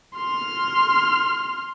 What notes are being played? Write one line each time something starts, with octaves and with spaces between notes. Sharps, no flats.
C6 F6